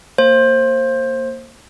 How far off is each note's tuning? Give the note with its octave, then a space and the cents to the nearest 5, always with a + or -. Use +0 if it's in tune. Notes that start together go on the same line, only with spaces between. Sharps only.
A#3 -20 C5 +20